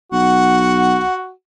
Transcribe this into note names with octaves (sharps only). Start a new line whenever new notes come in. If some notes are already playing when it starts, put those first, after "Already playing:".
B1 F#4 F#5